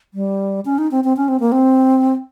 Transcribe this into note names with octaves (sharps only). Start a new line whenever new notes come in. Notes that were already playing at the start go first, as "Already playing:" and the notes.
G3
C#4
D#4
C4
C4
C#4
C4
A#3
C4